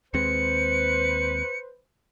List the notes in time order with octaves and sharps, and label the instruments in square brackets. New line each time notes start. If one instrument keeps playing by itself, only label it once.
[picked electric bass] D#2 G#3 C4 [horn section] B4 C5 [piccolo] C#7